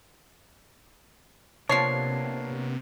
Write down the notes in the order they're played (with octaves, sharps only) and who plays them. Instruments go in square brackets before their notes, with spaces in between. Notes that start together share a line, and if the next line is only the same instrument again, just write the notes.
[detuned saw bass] C3 [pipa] F3 C#5 [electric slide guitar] A#3 B3 D4 [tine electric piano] A5 C7